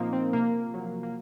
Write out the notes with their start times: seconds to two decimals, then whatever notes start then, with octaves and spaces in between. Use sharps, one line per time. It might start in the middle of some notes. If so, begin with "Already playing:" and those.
Already playing: A#2 F3 A#3 C4 D#4
0.13 C4
0.33 C3 A#3
0.74 F#3
1.03 A#3